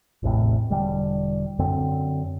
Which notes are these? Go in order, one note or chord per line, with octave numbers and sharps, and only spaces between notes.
A1 E2 A2 C3
E1 D3 G3
F#2 D3 C4